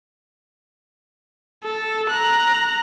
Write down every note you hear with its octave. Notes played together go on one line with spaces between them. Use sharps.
A4
A#5 F#6